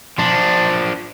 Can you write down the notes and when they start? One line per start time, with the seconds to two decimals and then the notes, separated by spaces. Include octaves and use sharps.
0.18 F3 D4